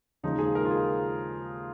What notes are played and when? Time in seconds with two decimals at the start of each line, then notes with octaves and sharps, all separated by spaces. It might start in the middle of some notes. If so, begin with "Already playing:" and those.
0.23 D#2 C#3 F3 G#3 D#4
0.39 G#4
0.55 A#4
0.65 F4
0.71 G#4